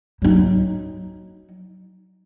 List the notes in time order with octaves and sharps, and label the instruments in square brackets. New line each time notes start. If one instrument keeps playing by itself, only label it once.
[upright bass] F#3 D#4